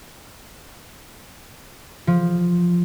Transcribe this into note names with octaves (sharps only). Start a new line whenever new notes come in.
F3